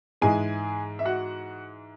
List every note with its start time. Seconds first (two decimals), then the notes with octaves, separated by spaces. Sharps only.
0.22 G#2 E3 G#3 G#4 G#5
0.99 E5
1.05 F#4 F#5